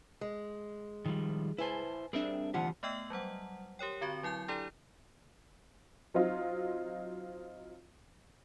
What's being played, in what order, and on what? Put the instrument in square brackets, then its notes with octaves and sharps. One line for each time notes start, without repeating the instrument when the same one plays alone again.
[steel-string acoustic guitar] G#3
[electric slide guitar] D#3 F3 G3
[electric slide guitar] E4 C5 [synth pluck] B4 G#5 A5
[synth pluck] G3 C4 D4 [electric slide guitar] G#4 A#4 E5
[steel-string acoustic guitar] D2 F3 F#5 [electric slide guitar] E3 F4 G4
[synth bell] A3 B3 D#5 G5 E6 F#7
F#3 G3 C5 F#5
G4 A#4 C#5 G5
D3 C4 F#4 C#6
F#3 E4 G#5 G6
D4 E4 G4 A4 D5 A#5
[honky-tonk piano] F#3 C4 D#4 F4